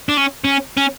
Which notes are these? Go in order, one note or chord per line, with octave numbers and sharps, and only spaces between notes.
D4
C#4
C#4
C#4